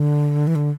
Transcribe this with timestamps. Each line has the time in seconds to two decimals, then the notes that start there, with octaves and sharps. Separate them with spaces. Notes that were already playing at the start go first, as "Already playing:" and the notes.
Already playing: D3
0.47 E3
0.55 D3